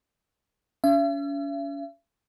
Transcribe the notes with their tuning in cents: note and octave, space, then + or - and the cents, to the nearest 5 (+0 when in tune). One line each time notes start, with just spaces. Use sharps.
C#4 +40 E5 +45